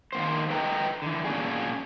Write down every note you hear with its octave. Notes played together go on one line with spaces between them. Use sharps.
D#3 A#3 C5
A4 B4 D#5 G5 A#5
D3 E3
A#2 C#4 D4 G#4